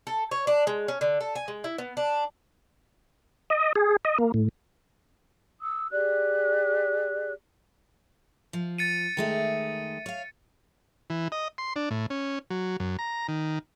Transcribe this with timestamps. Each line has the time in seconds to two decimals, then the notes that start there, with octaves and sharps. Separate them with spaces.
0.07 A4
0.31 C#5
0.47 D4
0.67 G#3
0.88 C#4
1.01 D3
1.21 A4
1.35 G#5
1.48 G#3
1.64 E4
1.78 B3
1.97 D4
3.50 D#5
3.75 G#4
4.05 D#5
4.18 A#3
4.34 A2
5.60 D#6 E6
5.92 G4 G#4 D5 F#6
8.53 F3
8.78 A6 C#7 D#7
9.17 D#3 G#3 A3
10.06 C#5 F5
11.10 E3
11.32 D#5
11.58 C6
11.76 D4
11.91 A2
12.10 C#4
12.50 F#3
12.80 F#2
12.99 A#5
13.28 D#3